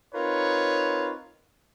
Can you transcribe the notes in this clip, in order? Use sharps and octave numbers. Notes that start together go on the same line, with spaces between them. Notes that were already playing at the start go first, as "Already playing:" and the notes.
C4 D#4 F4 A#4 B4 C#5